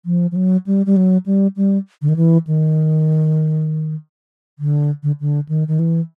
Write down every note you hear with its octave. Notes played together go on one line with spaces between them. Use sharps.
F3
F3
F#3
G3
G3
F#3
G3
G3
D3
D#3
E3
D#3
D3
D3
D3
D#3
D#3
E3